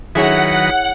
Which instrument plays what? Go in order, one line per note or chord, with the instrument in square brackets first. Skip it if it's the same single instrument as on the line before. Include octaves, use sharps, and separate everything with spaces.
[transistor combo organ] D#3 F#3 B4 [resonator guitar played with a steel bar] E4 G#4 C#5 [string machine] F#5